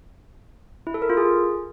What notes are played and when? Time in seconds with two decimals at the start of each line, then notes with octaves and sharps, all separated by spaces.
0.87 E4
0.94 A4
1.02 A#4
1.10 F4
1.17 G#4